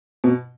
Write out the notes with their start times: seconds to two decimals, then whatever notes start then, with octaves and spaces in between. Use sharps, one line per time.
0.24 B2